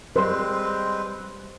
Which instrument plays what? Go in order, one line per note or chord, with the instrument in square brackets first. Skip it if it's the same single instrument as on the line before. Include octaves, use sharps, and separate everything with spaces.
[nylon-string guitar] G3 [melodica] G#3 C4 B4 [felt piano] C5 C6